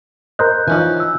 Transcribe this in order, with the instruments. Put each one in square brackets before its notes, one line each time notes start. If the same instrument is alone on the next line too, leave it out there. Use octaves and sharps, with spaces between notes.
[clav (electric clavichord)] A#4 C5 D#5 [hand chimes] F#6 G6
[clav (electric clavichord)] E3 D#4 [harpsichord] F3 C#4 G#5
[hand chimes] E6